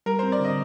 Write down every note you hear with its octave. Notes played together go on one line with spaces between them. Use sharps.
G3 A#4
C4 C5
D5
D3 D#5